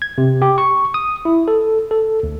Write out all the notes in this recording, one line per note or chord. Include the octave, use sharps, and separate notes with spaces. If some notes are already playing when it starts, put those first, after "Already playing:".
G#6
C3
G4
C#6
D#6
E4
A4
A4
D2